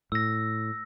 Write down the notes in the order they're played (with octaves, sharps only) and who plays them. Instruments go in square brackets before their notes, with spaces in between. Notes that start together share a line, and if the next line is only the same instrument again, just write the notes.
[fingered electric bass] A2 [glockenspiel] E6 A#6